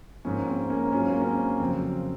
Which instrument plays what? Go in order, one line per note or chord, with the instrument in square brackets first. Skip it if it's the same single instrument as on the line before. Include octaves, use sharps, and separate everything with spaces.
[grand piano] G#2 F3 A#3 C#4
C4
A#3 C#4
G#2 F#3 C#4 F4
A#3
C#4
C4
F2 C#3 F#3 C4